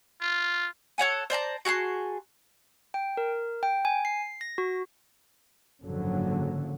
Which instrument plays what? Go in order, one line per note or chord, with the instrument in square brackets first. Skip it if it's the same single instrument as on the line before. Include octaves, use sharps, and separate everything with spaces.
[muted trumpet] F4
[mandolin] A4 C#5 F#5 G#5
C5 D5 A5 A#5
F#4 G#4 A5 C6
[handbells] G5
A#4
G5
G#5
C7
A#6
F#4
[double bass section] F#1 G#2 D3 F3 F#3